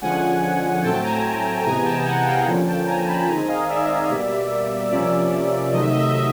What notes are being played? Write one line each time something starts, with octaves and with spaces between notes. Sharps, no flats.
D3 F3 G#3 C#4 F#5 G#5
A2 F#3 A3 C4 G5 A5
G#5 A#5
C3 E3 G#3 B3 G#5 A#5
G5 A5
F#5 G#5
F5 G5
D3 F3 A#3 C#4
G5 A5
G#5 A#5
A5 B5
D#3 G#3 C4 G#5 A#5
D#5 F5
D5 E5
B2 G3 A#3
C3 F3 A#3 C#4 D5 E5
C3 D#3 F#3 A3 D#5
E5
D#5
E5
D#5
E5